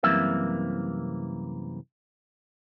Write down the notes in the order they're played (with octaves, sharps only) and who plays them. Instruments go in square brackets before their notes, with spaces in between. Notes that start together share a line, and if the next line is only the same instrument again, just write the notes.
[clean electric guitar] C2 F#2 C3 E3 A#3 E5